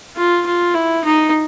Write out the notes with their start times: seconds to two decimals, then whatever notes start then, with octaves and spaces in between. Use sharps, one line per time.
0.16 F4
0.46 F4
0.74 E4
1.04 D#4